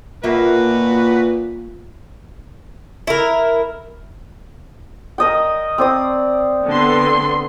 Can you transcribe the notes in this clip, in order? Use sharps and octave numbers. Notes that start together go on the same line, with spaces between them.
A#2 A#3 F4 F#4 B4 E5
E4 A#4
A#4 D#5 G5
C4 D5 D#6
D3 B3 C6